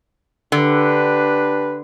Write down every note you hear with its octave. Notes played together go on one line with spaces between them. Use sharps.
D3 D4 G4 B4